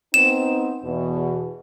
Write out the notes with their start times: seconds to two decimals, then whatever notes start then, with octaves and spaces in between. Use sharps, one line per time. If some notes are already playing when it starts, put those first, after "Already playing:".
0.14 B3 C4 D#4 E7
0.84 E2 B2